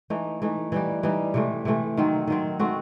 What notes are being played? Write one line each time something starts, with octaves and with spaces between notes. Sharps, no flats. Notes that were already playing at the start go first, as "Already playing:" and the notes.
E3 A3 D#4
E3 A3 D#4
E3 G3 D#4 G4
E3 G3 D#4 G4
C3 E3 A3
C3 E3 A3
D#3 F#3 C4
D#3 F#3 C4
D#3 A3 C4 F#4